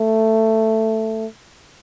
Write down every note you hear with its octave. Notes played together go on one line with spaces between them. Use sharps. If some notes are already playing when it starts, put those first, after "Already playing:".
Already playing: A3